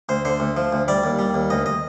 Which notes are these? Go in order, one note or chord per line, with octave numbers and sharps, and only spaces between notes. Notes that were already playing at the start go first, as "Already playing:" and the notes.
D2 C5
D3 C5
D2
F3
D2
G3 D5
D#2
G3
D#2
D2 D#5
D#5